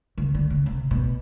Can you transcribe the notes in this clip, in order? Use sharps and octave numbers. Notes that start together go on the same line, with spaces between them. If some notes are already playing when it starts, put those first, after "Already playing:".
C#3
D3
C#3
C3
B2